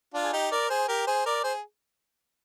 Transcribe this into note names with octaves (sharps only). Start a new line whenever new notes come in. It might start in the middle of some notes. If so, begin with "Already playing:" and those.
D4 F4
G#4
D#4 G4
A#4 D5
G#4 C5
G4 A#4
G#4 C5
A#4 D5
G#4 C5